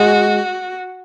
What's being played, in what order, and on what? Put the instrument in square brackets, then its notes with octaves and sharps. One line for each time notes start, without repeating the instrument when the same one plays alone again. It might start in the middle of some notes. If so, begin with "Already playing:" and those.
Already playing: [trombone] G#3 [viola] F#4